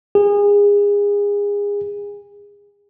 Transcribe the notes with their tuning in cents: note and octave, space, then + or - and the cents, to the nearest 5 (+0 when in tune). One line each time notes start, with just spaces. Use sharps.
G#4 -30